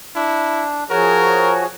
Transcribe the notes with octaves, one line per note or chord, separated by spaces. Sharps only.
D4 E4
F3 F#4 G#4 A#4 C#5